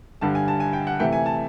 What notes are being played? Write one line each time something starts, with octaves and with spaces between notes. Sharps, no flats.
G2 D3 G3 A5
G#5
A5
G#5
G5
F#5
C3 E3 A3 G5
G#5
A5